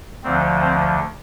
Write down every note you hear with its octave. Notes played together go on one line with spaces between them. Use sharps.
D2 D3 F3 C4
C4